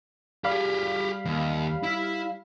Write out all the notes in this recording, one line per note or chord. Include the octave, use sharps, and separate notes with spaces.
G3 G4 G#4 F5 B5
D#2
E4